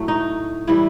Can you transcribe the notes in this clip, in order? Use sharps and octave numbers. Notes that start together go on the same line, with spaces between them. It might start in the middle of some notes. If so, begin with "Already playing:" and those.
Already playing: A2 F#3 A3
D#4
A2 E3 G3 E4